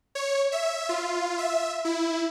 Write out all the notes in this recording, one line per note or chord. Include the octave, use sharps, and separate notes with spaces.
C#5
E5
F4
E5
E4